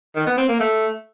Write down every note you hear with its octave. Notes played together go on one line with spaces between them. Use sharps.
D#3
B3
C4
A#3
A3